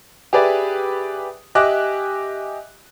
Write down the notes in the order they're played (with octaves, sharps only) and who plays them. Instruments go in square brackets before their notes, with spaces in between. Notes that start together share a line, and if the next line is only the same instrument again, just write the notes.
[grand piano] G4 G#4 B4 D5 E5
G4 D#5 E5 G#5 D6 F#6